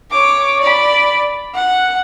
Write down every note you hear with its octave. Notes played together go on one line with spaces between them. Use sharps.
C#5 D6
D5 B5
F#5